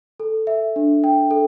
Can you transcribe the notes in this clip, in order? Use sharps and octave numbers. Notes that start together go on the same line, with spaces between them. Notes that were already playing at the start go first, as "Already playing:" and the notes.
A4
E5
D4
G5
A4